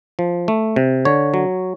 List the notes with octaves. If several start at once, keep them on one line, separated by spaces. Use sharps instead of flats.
F3
A3
C3
D3 C#5
F#3